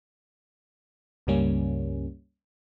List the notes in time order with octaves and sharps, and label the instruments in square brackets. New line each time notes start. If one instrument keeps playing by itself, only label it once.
[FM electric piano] C#2 G2 C#3 G3 A#3 C#4